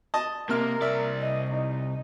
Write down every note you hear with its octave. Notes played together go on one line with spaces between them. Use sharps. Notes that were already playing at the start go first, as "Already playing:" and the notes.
D#5 A5
C3 A#3 A#4 F6
C2 D5 E5
D#5
D#4